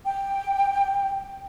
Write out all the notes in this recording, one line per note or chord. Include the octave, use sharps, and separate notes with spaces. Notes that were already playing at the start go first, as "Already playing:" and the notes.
G5